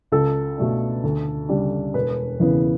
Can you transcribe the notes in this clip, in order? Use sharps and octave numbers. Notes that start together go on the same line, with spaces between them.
C#2 A4
B2 A3 D4
D2
C#3 G3 D4
E1 B4
E2 C#3 E3 B3